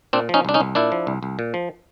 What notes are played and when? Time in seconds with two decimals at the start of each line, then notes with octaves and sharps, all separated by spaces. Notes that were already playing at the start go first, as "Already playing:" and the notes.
0.13 A#2 C4 D4
0.29 F3 C#4 D#4
0.45 C2 D4
0.54 C#4 D#4
0.60 C2
0.75 A#2 D4 E4
0.92 F3
1.07 C2
1.23 C2
1.39 A#2
1.54 F3